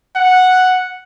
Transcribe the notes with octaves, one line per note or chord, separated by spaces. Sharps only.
F#5